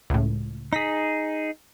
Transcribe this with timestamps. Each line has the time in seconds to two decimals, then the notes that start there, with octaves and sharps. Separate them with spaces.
0.10 C#2 A2
0.73 D#4 G#4 A#6 B6